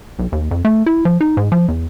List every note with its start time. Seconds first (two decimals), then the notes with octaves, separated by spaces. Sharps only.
0.19 B1
0.32 D#2
0.51 F2
0.65 A3
0.86 E4
1.05 F3
1.21 D#4
1.37 G#2
1.52 F3
1.68 E2